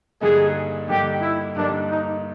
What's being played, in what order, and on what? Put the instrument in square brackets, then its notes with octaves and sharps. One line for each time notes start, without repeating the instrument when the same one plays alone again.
[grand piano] G2 D3 G3 A#3 D#4 [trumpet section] G#4
[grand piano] G2 D3 G3 A#3 D#4 [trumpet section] G4
[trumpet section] E4
[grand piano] G2 D3 G3 A#3 D#4 [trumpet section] D4
[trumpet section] D#4